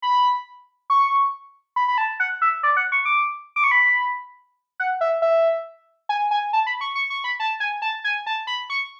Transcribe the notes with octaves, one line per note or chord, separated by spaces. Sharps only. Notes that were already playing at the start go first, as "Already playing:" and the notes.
B5
C#6
B5
B5
A5
F#5
E5
D5
F#5
C#6
D6
D6
C#6
B5
F#5
E5
E5
G#5
G#5
A5
B5
C#6
C#6
C#6
B5
A5
G#5
A5
G#5
A5
B5
C#6